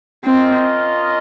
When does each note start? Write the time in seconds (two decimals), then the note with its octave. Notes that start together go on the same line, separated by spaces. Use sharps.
0.25 C4 C#4 F4 A#4 D#5